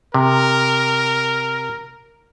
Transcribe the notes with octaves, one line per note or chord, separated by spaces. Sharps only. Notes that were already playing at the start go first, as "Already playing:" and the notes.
C3 A#4